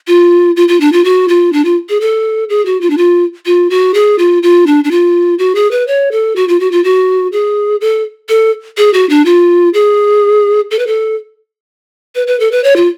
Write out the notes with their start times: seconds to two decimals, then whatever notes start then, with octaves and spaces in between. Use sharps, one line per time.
0.08 F4
0.57 F4
0.68 F4
0.81 D4
0.93 F4
1.05 F#4
1.28 F4
1.53 D4
1.65 F4
1.89 G#4
2.01 A4
2.49 G#4
2.66 F#4
2.81 F4
2.90 D4
2.98 F4
3.46 F4
3.70 F#4
3.94 G#4
4.19 F4
4.43 F4
4.67 D4
4.84 D4
4.91 F4
5.39 F#4
5.55 G#4
5.71 B4
5.87 C#5
6.12 A4
6.36 F#4
6.48 F4
6.60 F#4
6.72 F4
6.84 F#4
7.32 G#4
7.81 A4
8.29 A4
8.78 G#4
8.93 F#4
9.10 D4
9.25 F4
9.74 G#4
10.71 A4
10.79 B4
10.87 A4
12.15 B4
12.27 B4
12.40 A4
12.52 B4
12.64 C#5
12.76 F4